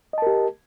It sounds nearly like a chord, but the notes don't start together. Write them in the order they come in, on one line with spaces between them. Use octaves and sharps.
D#5 A5 A#4 G4